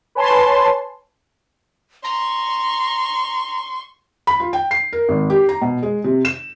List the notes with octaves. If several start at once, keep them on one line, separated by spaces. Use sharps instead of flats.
B4 C#5 G#5 A5 C6
A#5 C6 C#6
B5
F4
G5
C7
A#4
G#1
G4
A#5
B2
G#3
C3
E7